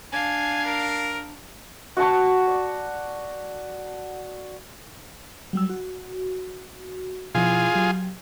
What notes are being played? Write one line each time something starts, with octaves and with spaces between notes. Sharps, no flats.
D4 F5 G#5
A#4 D7
F#4 F#5 A5 C#6
D5
F#3 G3 E6
F#4
B2 F3 E4 F4 G#4
F#3 G4